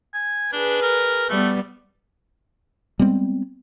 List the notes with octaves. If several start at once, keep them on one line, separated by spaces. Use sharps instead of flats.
G#5
D4 G#4 B4
A#4
G3 A3 B3
G3 G#3 B3 C4